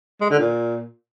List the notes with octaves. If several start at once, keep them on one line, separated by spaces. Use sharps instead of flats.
G#3
D3
A#2